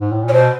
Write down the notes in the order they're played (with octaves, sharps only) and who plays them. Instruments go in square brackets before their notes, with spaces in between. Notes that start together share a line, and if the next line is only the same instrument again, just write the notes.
[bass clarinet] G#2
A2
A#2
[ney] C#5
[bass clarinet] B2 [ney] C5